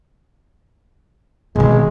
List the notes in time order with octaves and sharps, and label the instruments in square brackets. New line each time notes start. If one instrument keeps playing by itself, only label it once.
[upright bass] B2 D#3 [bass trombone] G#3